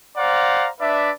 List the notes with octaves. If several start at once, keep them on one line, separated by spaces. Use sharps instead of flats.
C5 D5 F5 F#5 A#5
D4 B4 D5 E5